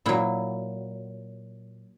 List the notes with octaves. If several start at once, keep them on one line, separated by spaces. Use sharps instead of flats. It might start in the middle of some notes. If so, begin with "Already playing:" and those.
A#2 F#3 E4